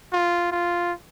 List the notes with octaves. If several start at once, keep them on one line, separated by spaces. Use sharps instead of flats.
F4
F4